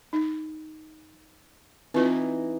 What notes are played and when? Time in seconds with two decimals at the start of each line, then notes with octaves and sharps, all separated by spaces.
0.13 D#4
1.94 E3 C4 D#4 F4 B4